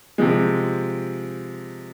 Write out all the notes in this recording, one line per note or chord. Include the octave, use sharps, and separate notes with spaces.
C3 F3 G#3